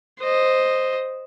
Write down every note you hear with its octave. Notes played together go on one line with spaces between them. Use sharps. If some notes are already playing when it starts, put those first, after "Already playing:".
C5 D#5